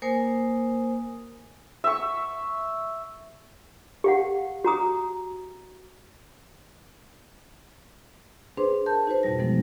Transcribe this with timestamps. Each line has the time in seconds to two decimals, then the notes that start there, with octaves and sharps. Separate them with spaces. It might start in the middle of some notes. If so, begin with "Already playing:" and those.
0.02 A#3 A#4 C5 G#5 D#6
1.84 E5 C#6
4.04 G4 F5 F#5
4.64 F#4 A#5 D#6
8.57 D4 G#4 B4 C5 C6
8.86 A#4 A5 G6
9.07 D#4 F#4 B4 C5
9.23 F2 G#2 B2 G3 A#6
9.38 E3 F3 G#3 B3 D#4